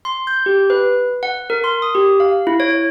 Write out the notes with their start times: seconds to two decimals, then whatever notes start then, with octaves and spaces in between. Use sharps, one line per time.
0.05 C6
0.27 G6
0.46 G4
0.70 B4
1.23 F#5
1.50 A#4
1.64 C6
1.82 D#6
1.95 G4
2.20 F5
2.47 E4
2.60 C#5